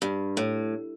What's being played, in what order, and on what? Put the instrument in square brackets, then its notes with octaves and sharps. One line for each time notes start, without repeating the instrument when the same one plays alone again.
[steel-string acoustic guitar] G2
A2